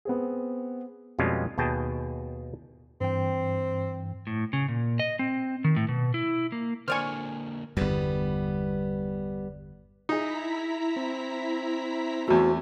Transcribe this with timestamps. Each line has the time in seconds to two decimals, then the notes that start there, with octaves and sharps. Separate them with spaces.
0.05 B3 C4 G#4
1.19 F2 B2 G3 G#3 C#4 F4
1.58 D#2 B2 G#4 G5 A5
3.01 G2 E3 C4 G5
4.27 A2
4.53 C#3
4.68 A#2
5.00 D#5
5.19 C4
5.64 D#3
5.76 A2
5.89 B2
6.14 E4
6.52 A#3
6.88 D3 A#3 D4 C5 D5 G#5 C#6 F6
7.77 G1 E2 G3 B3
10.09 D#4 E4 G#4 A#5 B6
10.96 C4
12.28 E2 A3 F#4